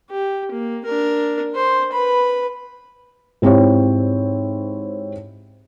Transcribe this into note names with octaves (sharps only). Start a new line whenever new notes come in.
G4
A#3
D4 A#4
C5
B4 B5
G#2 C4 E4 G4 C#5